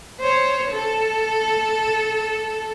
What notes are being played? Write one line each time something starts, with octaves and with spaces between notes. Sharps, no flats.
C5 C#5
A4